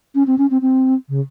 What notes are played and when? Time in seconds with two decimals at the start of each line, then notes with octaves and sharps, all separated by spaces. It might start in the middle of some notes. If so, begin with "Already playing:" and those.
0.15 C#4
0.27 C4
0.38 C#4
0.51 C4
0.62 C4
1.09 C#3